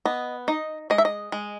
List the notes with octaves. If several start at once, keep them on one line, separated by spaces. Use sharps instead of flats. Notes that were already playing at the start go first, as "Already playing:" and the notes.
B3 D#5
D#4 D#5
G#3 D#5
E5
D#5
G#3